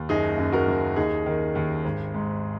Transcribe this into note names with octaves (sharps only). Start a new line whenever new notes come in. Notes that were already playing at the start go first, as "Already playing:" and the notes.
Already playing: D#2
F#1 D#4 G#4
F#2
F#4 A#4
F#1
D#2 D#4 G#4
D#3
D#2
G#1
G#2